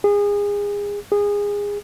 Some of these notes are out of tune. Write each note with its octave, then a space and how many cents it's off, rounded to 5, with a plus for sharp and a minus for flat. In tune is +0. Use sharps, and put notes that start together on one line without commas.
G#4 -25
G#4 -20